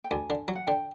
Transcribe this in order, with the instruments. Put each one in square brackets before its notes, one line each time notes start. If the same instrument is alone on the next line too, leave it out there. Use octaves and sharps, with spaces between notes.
[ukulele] G5
[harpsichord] D2 [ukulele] G#5
[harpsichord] D3
F#3
[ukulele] F#5
[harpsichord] D3 [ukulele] G5